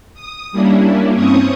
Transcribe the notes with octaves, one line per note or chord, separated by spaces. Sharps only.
D#6
G3 A#3 C#4 D4 E4
G2 C4 C#4 C#6 D#6